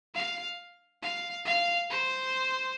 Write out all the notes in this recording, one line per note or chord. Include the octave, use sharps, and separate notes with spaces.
F5
F5
F5
C5